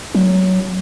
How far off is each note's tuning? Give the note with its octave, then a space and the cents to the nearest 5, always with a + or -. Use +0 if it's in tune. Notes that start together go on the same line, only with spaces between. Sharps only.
F#3 +10